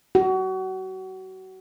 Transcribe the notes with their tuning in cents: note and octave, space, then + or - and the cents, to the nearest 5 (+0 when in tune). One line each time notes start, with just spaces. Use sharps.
F#4 +30